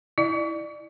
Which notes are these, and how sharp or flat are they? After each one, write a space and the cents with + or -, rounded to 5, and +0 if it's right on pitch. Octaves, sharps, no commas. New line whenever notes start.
E4 +0 D5 +25